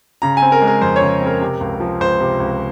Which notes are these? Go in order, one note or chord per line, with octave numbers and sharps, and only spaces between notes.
C#3 A#5
C4 G#5
A#4
G#3
A#4
F2 C5
C#5
C#3
C4
A#4
C3
C#2
F3
C#2 C5
C3
C#2